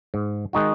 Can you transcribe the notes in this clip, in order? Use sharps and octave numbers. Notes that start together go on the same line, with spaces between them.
G#2
D#3 G#3 D#4 F#4